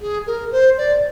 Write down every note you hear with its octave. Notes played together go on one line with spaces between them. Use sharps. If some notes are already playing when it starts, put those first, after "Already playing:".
G#4
A#4
C5
D5